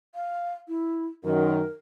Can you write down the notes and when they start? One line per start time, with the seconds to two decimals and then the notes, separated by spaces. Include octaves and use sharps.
0.15 F5
0.68 E4
1.24 F#2 D#3 A#4